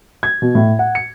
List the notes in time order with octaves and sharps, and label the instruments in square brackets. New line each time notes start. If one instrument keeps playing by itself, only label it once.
[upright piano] G#6
B2
A2
F#5
C#7